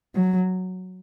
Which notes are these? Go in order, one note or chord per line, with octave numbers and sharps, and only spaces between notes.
F#3